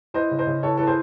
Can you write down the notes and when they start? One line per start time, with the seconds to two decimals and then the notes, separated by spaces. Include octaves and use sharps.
0.14 E3 C5 D#5
0.31 C#3
0.39 C5 D#5
0.47 C#3
0.63 E3 A4 C#5
0.77 E3 A4
0.87 G#4 C5